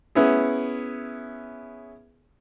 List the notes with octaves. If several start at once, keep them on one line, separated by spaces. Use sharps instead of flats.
B3 C#4 E4 G#4